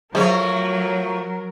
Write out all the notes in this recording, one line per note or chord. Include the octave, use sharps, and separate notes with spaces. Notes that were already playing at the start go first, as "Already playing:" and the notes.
F3 F#3 G#3 A3 A#4 C5 C#5